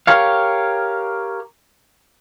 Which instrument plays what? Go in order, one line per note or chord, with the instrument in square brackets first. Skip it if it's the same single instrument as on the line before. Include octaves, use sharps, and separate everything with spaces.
[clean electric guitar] G4 A#4 C#5 F5